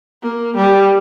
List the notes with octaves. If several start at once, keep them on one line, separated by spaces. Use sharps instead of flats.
A#3
G3